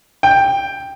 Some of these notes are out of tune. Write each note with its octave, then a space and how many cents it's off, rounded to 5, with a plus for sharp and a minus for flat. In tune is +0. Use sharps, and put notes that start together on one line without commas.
G5 +10